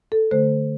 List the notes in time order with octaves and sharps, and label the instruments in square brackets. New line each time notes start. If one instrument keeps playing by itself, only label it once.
[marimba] A4
D3 A3 C5